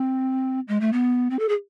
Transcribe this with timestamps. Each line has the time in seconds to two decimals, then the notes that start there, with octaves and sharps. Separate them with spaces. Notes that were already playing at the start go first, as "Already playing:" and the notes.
Already playing: C4
0.68 G#3
0.80 A3
0.92 B3
1.30 C4
1.39 A4
1.49 G#4